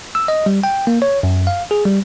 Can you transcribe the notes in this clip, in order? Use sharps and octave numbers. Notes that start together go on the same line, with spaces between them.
E6
D#5
G3
G5
A#3
C#5
F#2
F5
G#4
G3